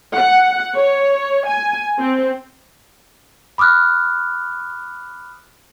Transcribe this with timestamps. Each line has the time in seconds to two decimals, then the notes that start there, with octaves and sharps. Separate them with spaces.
0.14 F#5
0.75 C#5
1.46 G#5
1.98 C4
3.58 B5 D6 D#6 F6 F#6